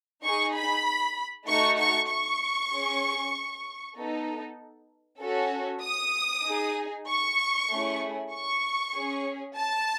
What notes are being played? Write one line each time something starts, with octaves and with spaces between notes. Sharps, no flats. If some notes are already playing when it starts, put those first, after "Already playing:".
D#4 G#4 C#6
B5
A3 D#4 F#4 A4 C#6
C#6
C#6
C#4 G#4
B3 D#4 A4
C#4 F#4 A4
D#6
D#4 G#4
C#6
A3 C#4 E4 G#4
C#6
C#4 G#4
A5